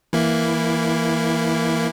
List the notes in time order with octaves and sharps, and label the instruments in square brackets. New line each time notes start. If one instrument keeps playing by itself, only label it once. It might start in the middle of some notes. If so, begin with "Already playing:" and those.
[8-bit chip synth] E3 A#3 E4